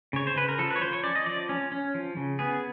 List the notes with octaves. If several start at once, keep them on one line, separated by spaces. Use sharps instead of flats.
C#3 C#5
C5
C#3 B4
A#4
F3 A4
B4
C#5
F3 C5
C#5
C#4 D5
D#5
F3 D5
C#4
C#4
F3
C#3
B3 G#4